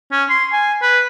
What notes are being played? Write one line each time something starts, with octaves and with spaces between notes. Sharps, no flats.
C#4
C6
G#5
B4